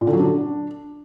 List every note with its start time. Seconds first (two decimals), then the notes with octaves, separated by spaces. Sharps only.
0.01 A#2
0.07 D3
0.13 F#3
0.19 D4